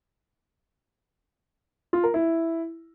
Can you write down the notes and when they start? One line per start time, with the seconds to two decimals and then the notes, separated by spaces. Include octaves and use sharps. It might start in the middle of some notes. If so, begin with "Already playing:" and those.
1.93 F4
2.04 A#4
2.14 E4